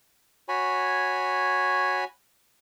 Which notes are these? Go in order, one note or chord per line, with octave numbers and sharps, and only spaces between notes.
F#4 C#5 G#5 B5